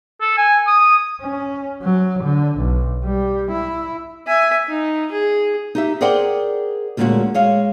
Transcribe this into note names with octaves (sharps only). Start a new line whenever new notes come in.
A4
G#5
D#6
C#4
F#3
D3
B1
G3
E4
E5 G#5
D#4
G#4
D#4 G4 E5
G#4 A#4 C5 D5 F#5 G5
D2 A#2 G#3 A#3 C#4 F#4
G#3 C#5 F5